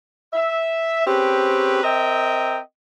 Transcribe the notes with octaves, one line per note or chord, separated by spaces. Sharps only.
E5
C4 C#4 G4 G#4 B4
C4 A#4 D#5 E5 G5